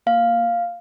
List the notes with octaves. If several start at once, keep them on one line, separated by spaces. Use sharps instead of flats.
A#3 F5